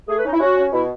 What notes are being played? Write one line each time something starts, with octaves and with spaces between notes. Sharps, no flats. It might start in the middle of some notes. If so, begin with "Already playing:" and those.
A3 G#4
B4
C#4 D#4
E4
C#4 F#4
C#4
B2 E4